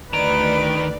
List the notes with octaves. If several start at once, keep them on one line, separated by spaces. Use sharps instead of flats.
D2 D#3 B4 D5 A#5 D7